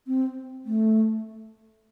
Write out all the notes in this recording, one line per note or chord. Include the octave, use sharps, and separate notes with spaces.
C4
A3